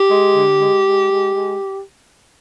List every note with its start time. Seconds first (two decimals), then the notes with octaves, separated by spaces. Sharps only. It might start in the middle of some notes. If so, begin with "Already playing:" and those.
Already playing: G4
0.09 G#3
0.34 D3
0.60 G#3
0.84 G#3
1.09 G#3
1.34 G#3